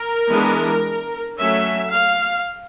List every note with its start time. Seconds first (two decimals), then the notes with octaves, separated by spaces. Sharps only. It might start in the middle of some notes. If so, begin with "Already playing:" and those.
Already playing: A#4
0.29 E3 G#3 B3 D4
1.38 F#3 A3 C#4 E5
1.92 F5